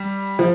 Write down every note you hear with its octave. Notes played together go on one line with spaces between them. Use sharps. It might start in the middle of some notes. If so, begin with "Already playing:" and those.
Already playing: G3
F3